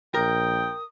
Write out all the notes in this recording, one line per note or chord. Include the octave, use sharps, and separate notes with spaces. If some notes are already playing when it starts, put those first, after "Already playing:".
A#1 A#4 G5 D#6